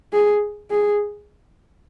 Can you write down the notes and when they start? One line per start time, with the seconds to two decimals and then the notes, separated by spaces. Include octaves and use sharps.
0.13 G#4
0.70 G#4